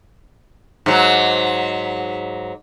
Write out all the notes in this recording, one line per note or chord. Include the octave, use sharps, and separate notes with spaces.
G#2 F#3